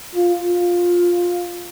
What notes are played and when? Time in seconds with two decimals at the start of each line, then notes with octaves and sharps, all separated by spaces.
0.15 F4
0.46 F4